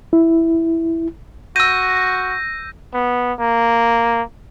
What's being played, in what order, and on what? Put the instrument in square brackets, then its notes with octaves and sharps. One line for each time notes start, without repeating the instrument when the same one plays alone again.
[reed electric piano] E4
[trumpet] F#4 [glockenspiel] E6 D#7 [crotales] G6 A#6
[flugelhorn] B3
A#3